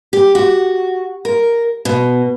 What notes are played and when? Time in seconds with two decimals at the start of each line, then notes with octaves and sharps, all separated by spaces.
0.13 G4
0.35 F#4
1.25 A#4
1.85 B2